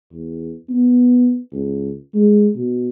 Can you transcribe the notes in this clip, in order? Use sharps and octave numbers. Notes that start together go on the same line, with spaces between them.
E2
B3
C#2
G#3
B2